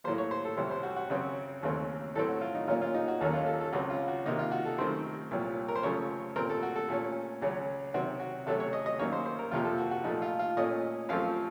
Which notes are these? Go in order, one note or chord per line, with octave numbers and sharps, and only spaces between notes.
A2 F#3 A#3 C5
C#5
C5
A4
C2 C3 F#3 C5
C5
F#4
F#4
F#2 C#3 F#3 C4
D#2 C#3 F#3 A3 C4
A2 F#3 A3 C4 A4
F#4
F4
D#4
A#2 F#3 A#3 C#4 F4
F4
D#4
F#4
D#2 D#3 F#3 A#3 C#4 A4
F4
A4
A4
C#2 C#3 F#3 C4 F#4
F4
F#4
C3 D#3 A#3 D#4
F4
F#4
A4
F#2 D#3 A3 C4 C5
C2 A#2 F#3
A#4
C5
F#2 C#3 F3 A3 C#5
A#2 A3 C4 A#4
A4
F#4
A4
A#2 A3 C#4 A4
C#2 C#3 F#3
C3 D#3 F#3 C4 F#4
F#4
C3 F#3 A3 C#4 A4
C#5
D#5
D#5
F#2 D#3 A#3 C#4 C#5
C5
C5
A#4
F2 C3 F3 A#3 F4
A4
F#4
F#4
A#2 F3 A3 D#4
F4
F4
A#2 A3 C#4 D#5
F#2 F3 A3 C4 F5